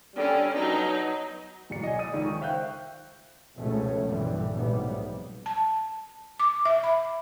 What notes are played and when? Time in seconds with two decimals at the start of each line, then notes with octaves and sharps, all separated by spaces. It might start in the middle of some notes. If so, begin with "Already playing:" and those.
0.16 D3 G3 C#4
0.54 B2 F#3 D#4
1.70 D1 B1 D5 C#7
1.83 D#5 G#5
1.99 D5 D#6 D#7
2.13 C#2 D#3
2.25 C#6
2.41 C5 E5 F5 G5 F#6 G6
3.56 F1 C#2 B2 A3 C#4
4.04 B1 G2 A#2 D3 E3 G3
4.54 F1 B1 G#2 C3 G3 B3
5.46 A5
6.40 D6
6.65 E5
6.84 B5